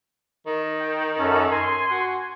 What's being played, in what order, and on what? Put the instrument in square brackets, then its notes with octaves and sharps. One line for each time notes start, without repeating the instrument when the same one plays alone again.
[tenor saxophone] D#3
[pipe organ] G5
F#2 C#4 A4
G#5 C6
[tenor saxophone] F#4